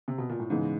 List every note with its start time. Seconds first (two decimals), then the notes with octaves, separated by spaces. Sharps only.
0.08 C3
0.18 B2
0.30 A#2
0.40 A2
0.50 G#2 C#3 E3 G#3 B3